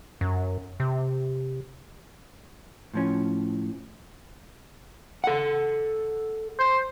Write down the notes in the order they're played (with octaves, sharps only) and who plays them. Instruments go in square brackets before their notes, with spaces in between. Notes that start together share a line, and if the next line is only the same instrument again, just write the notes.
[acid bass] F#2
C3
[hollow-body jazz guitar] A2 F3 C#4
[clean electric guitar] A4 F#5
[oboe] C5